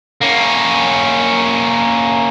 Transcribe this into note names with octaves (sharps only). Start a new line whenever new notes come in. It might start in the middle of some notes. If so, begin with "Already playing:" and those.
A#3 C#4